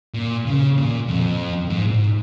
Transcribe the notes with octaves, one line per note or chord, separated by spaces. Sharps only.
A#2
C#3
A#2
F2
G#2
A#2
G#2